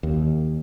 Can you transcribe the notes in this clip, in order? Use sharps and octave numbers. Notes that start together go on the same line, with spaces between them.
D#2